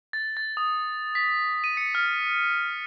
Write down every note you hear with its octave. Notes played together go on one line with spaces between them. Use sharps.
A6
A6
D#6
B6
D#7
C#7
F6